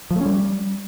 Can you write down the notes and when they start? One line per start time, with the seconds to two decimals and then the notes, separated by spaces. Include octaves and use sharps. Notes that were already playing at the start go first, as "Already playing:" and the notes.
0.11 F3
0.16 A3
0.21 C#4
0.26 G3